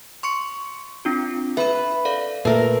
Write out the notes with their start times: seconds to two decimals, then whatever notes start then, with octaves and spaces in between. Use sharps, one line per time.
0.23 C6 C#6 C#7
1.05 C4 D4 F4
1.57 B4 E5 B5
2.05 A4 D5 F5
2.45 A#2 A3 A#4 B4